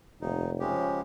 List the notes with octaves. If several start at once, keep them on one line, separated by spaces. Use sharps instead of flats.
F1 D#2 D#4
C#3 F3 G#3 C#4 G4